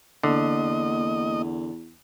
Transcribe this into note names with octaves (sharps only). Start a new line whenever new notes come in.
E2 D3 A#3 D#5